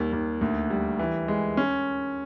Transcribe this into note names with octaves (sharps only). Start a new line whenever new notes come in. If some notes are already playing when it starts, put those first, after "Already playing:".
Already playing: D#2 G3
D#2
D2
G3
E3
G#3
C#4